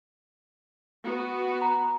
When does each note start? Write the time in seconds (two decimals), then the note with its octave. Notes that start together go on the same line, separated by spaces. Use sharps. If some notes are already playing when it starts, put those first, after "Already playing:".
1.03 B3 F#4
1.62 A#5